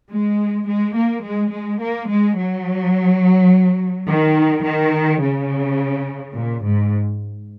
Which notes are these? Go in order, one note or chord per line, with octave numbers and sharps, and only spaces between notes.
G#3
G#3
A#3
G#3
G#3
A#3
G#3
F#3
D#3
D#3
C#3
A#2
G#2